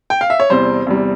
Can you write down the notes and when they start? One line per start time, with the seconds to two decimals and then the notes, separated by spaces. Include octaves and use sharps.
0.10 G5
0.21 F5
0.30 E5
0.40 C#5
0.50 E2 C3 G3 C5
0.87 E2 C3 G3